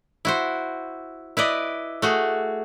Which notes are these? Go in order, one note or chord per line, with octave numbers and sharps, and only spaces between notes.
E4 F#4 C5
E4 B4 D5 D#5
A3 F#4 G#4